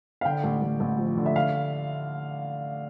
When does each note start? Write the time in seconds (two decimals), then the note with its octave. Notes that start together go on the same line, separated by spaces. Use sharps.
0.21 F5
0.25 D3 G5
0.44 A1
0.62 A1
0.80 A1
0.98 F3
1.17 D3
1.26 E5
1.36 F5